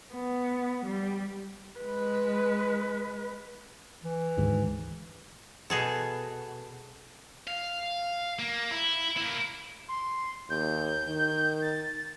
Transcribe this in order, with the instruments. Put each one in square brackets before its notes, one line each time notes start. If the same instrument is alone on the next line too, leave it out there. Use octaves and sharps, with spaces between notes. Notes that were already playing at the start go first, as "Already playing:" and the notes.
[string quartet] B3
G3
[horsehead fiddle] G#3 B4
[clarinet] E3
[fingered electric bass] D2 G#2 D#3
[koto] B2 G#4 A4
[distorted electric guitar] F5
A#3
E4
A#3 E4
[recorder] C6
[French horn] D#2 [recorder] G6
[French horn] D#3
[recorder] A6